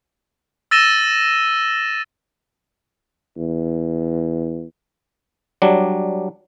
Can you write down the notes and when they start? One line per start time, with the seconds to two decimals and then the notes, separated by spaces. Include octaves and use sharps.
0.71 E6 A6 A#6 D#7 E7 G7
3.37 E2
5.62 F#3 G3 D4